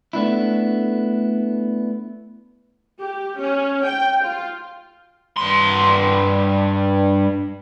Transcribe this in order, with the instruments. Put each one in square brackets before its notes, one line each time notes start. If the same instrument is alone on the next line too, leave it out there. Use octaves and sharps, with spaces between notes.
[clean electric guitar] A3 B3 D4 E4
[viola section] G4
C#4
G5
F4
[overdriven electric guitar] G2 C6